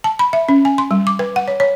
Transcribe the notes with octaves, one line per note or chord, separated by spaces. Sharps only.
A5
B5
E5
C#4
G#5
C6
G3
D6
B4
F#5
C#5
C#5